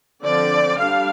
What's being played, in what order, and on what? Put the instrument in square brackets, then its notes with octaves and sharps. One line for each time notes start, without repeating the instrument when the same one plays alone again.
[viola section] D3 F3 C4 D5
G3 D4 F5